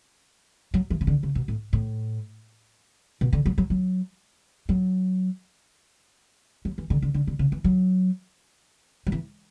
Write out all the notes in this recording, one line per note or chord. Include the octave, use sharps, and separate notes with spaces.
F#3
E3
C#3
D3
C#3
B2
A2
A2
B2
D3
F#3
F#3
F#3
F#3
F#3
E3
D3
D3
D3
D3
C#3
E3
F#3
F#3
E3